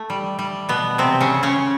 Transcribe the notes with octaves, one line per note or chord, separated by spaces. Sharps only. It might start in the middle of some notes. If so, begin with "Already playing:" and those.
Already playing: A3
G3
G3
B2 B3
C3 C4
C#3 C#4
C#3 C#4